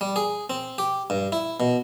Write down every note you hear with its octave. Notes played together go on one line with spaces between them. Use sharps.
G3
G#4
C4
G4
G2
E4
B2